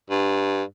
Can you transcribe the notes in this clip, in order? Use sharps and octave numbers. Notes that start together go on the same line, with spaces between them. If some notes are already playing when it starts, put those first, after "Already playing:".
G2